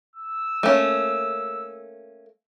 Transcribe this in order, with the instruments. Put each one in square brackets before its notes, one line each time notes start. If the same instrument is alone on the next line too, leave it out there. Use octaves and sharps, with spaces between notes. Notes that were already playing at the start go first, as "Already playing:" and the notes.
[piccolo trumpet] E6
[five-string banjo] A3 A#3 C#4